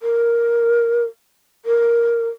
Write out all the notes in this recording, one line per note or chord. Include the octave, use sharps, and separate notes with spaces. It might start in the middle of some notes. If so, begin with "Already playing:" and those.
A#4
A#4